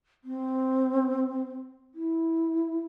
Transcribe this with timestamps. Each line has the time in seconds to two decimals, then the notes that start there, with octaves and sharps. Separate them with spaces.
0.24 C4
1.95 E4